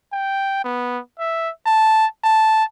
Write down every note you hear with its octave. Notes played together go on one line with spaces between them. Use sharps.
G5
B3
E5
A5
A5